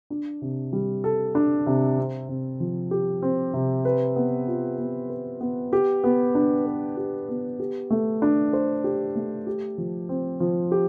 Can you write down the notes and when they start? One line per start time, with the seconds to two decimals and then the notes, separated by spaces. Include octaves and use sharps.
0.10 D4
0.42 C3
0.73 G3
1.04 A4
1.35 D4
1.66 C3
1.98 C4
2.29 C3
2.60 F3
2.91 G4
3.22 C4
3.54 C3
3.85 B4
4.16 B3
4.47 F4
4.78 B3
5.10 B4
5.41 B3
5.73 G4
6.04 B3
6.35 D4
6.66 B4
6.97 G4
7.28 B3
7.60 G4
7.91 A3
8.22 D4
8.53 C5
8.84 G4
9.16 A3
9.47 G4
9.78 F3
10.09 C4
10.40 F3
10.72 G4